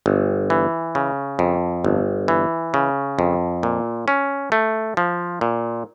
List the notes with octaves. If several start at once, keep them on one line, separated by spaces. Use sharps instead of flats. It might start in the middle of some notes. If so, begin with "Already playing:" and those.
G1
E3
C#3
F2
G1
E3
C#3
F2
A#2
C#4
A3
F3
A#2